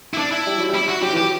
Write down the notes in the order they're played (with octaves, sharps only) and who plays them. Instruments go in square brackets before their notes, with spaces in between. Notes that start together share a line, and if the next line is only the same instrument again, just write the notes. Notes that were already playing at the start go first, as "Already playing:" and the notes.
[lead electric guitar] E4
D4
E4
[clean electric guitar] G3
F#3
G3
[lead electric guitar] E4
F#4
[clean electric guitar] F#3 [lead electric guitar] G4
[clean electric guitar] E3 [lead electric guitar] G4
[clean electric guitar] F#3